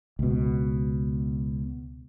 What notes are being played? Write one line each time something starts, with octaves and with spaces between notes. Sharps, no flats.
C#2 B2